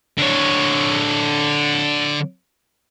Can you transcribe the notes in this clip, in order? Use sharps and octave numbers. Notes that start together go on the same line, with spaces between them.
D3 C#5